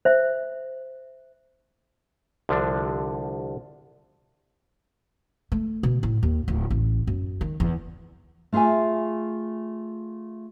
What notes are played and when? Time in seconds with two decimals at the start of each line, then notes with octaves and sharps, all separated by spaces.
0.05 C5 E5
2.49 C2 D3 F3 D4
5.52 A3
5.83 B2
6.03 A2
6.23 D#2
6.48 D1
6.71 A1
7.07 F#2
7.41 D#3
7.60 E2
8.53 A3 F4 G#4 E5 G#5